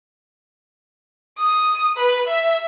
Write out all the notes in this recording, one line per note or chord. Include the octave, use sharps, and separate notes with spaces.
D#6
B4
E5